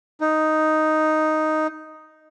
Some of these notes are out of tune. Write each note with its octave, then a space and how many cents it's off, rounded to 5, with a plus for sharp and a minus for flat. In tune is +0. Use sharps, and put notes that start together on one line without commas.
D#4 +0